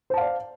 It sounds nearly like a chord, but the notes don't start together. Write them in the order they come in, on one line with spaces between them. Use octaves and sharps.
C5 A5 F5 D5